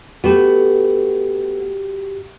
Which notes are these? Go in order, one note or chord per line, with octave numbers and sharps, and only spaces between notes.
A3 B3 F#4 G4